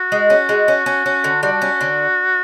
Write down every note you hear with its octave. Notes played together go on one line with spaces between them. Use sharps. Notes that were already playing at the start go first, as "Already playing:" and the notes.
Already playing: F#4
G#3
C#4
G#3
C#4
C#4
C#4
D3
G3 F#4
C#4
D3